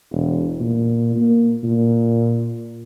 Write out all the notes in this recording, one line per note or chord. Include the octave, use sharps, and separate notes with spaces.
E1
A#2
A#3
A#2